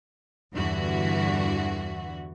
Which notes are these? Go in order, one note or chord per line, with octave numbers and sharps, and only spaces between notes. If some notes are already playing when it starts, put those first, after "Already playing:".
E2 G2 D3 E3 F#4